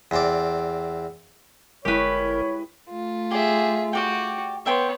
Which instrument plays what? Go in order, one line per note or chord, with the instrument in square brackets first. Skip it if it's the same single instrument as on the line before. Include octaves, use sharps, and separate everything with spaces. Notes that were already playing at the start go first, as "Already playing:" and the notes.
[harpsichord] E2 C4 D5
[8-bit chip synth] G1 A#4 [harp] G#3 E4 [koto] G4 B4 [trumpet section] C#5
[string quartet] A3 F4
[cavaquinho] G4 [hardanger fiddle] G#4 E5
[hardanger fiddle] F#4 [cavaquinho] G4 D5 G5
[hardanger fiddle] B3 C#5 [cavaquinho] E5 G5 C6